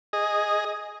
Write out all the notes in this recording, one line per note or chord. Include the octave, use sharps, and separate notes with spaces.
G#4 D#5